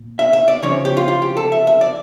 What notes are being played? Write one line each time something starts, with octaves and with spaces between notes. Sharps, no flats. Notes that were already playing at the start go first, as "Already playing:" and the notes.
Already playing: A#2
E5
E5
D5
C#3 F3 C#4 C#5
G4
F4
F4
G4
A4
E5
E5
D5